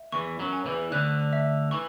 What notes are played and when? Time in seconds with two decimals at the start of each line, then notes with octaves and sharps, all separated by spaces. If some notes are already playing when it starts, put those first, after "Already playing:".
Already playing: E5
0.12 E2 E3 C#6
0.39 F#2 F#3
0.53 G#5
0.66 E2 E3
0.92 D2 D3 F#6
1.33 E5
1.71 E3 C#6